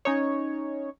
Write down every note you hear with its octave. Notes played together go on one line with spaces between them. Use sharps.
C#4 D#4 C#5